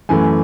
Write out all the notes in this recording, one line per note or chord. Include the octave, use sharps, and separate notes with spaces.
F#2 E3 A3 G#5